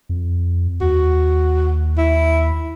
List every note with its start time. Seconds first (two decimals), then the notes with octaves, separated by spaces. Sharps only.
0.09 F2
0.81 D#2 F#4
1.98 E4